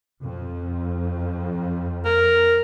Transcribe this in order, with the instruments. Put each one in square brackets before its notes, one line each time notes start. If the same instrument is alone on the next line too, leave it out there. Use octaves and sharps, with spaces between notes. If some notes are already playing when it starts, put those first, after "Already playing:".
[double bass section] F2
[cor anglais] A#4